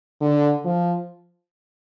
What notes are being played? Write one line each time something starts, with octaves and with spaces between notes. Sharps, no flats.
D3
F3